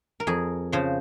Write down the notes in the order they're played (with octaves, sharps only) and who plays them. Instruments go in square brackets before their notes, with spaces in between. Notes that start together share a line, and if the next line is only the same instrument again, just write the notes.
[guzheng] A#4
F2 G#4
C#3 F3 C5